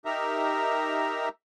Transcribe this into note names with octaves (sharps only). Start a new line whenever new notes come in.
D#4 G4 A#4 E5 A#5